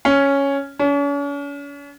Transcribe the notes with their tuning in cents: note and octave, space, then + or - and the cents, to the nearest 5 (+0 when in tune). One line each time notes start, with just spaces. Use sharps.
C#4 +0
C#4 +40